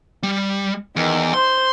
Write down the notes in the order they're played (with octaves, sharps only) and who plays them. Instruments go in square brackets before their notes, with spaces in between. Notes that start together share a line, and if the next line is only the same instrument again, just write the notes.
[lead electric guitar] G3
[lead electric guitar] E2 [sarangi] D#3
[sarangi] C5 [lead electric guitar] C6